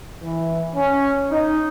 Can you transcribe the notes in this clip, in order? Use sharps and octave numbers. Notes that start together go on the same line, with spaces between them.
E3
C#4
D#4